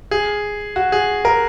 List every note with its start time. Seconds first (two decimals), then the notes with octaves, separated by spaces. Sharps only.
0.11 G#4
0.76 F#4
0.92 G#4
1.25 A#4